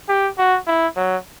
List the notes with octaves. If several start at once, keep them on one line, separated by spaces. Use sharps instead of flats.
G4
F#4
E4
F#3